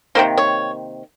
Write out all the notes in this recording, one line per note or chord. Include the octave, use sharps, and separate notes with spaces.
C3 D#3 A#3 C5
C#5